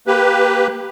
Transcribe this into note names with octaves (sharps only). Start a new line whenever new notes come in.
A#3 G4 B4